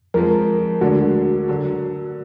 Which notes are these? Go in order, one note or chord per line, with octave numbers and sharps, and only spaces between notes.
F2 F3 G#3 A#4
D2 D3 G#3 D4 F#4
D3 F#3